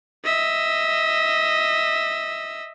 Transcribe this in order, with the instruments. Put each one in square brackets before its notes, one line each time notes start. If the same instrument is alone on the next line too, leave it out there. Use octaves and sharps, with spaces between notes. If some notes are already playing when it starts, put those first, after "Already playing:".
[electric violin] D#5 E5